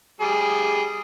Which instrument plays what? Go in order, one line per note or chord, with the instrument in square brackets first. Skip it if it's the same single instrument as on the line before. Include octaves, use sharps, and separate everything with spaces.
[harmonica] G3 G#4